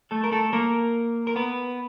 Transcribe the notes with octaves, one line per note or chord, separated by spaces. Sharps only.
A3 A4
A#4
A3 A4
A#3 A#4
A#4
B3 B4